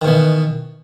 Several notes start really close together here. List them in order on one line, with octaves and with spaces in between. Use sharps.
D#3 B2 E3